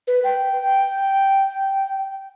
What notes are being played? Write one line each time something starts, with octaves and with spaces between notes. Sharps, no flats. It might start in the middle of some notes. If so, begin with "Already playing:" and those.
B4
G5